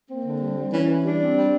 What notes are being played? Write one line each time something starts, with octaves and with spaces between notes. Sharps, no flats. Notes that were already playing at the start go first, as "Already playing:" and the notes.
A#3 C4
D3
G3
G3
E3 C#4
E3
G3 D4
C4
G3